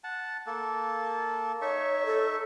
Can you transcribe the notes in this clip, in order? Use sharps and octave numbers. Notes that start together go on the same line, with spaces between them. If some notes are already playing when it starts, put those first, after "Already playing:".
F#5 A5
A#3 A4
D#4 C#5 E5 C#6
A4